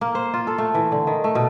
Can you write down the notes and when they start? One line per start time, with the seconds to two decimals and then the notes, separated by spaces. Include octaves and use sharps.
0.01 A#3
0.15 C5
0.34 F4
0.47 A4
0.58 A3
0.75 E3
0.92 D3
1.07 D#3
1.24 A3
1.35 B2